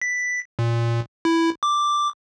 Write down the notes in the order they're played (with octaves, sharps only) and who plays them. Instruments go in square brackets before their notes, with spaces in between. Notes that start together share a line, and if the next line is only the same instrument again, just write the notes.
[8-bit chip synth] B6
A#2
E4
D6